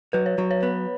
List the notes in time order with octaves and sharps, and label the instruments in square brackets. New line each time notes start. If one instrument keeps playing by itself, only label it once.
[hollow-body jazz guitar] F#3 [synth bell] B4
[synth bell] C#5
[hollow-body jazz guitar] F#3
[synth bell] C#5
[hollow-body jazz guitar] B3